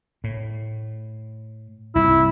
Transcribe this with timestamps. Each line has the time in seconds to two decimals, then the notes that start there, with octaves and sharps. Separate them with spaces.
0.24 A2
1.95 C2 G2 E4